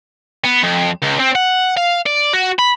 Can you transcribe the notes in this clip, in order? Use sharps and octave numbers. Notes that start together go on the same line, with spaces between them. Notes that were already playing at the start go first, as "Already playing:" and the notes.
B3
F2
C#2
C4
F#5
F5
D5
F#4
B5